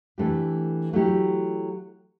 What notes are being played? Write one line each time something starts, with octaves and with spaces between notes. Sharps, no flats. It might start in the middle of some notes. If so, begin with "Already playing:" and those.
E3 A3 D4 G4
F#3 A3 E4 G4